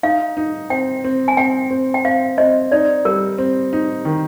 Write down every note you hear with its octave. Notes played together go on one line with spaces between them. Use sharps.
D#4 F5
D#4
C4 G5
C4
G#5
C4 G5
C4
G5
C4 F5
C4 D#5
D#4 D5
G3 A#4
C4
D#4
D#3